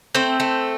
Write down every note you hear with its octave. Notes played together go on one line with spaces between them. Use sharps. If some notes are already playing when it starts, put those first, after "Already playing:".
A3 C4 C5
A3